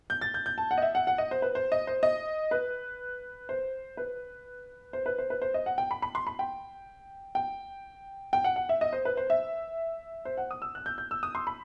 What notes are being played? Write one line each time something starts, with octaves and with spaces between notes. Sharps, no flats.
G6
A6
G6
G6
A5
F#5
D#5
E5
F#5
F#5
D#5
C5
B4
C5
D#5
C5
D#5
B4
C5
B4
C5
B4
C5
B4
C5
D#5
F#5
G5
B5
B5
C6
B5
G5
G5
G5
F#5
F#5
E5
D#5
C5
B4
C5
E5
C5
F#5
D#6
E6
F#6
G6
G6
E6
D#6
C6
B5